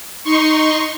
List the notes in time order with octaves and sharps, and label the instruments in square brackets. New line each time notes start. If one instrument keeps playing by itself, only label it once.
[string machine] D#4 C6 C#6